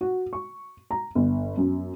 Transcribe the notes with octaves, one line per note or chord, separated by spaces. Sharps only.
F#4
C#6
A#5
G1
F#2